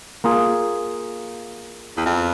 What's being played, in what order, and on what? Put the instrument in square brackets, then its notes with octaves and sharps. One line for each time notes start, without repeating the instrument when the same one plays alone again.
[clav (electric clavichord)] A#3 F4 G#4
[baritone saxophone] E2
F2